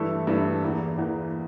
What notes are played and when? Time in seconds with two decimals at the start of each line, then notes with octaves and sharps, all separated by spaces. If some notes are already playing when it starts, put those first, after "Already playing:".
Already playing: G2 E3 A3 E4 A4
0.27 G2 E3 A3 E4 A4
0.62 E2 E3 A#3
0.97 E2 E3 A#3